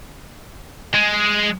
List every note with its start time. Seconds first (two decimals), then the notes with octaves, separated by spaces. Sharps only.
0.94 G#3